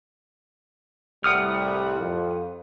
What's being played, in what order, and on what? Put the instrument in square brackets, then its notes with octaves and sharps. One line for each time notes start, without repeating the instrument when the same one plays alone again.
[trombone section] C2 A2 G3 [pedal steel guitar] F#5 D#6 F6
[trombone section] F2